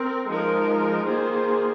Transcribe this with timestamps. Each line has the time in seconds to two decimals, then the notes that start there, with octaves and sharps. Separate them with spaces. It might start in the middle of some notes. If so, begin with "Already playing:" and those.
Already playing: C4 A#4
0.27 F3 G#3 D#4 A#4
1.05 D#3 A#3 F4 G#4 C5